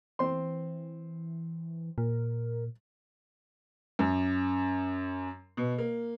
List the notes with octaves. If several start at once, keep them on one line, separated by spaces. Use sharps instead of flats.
E3 C4 C6
A#2 A#4
F#2
B2
A#3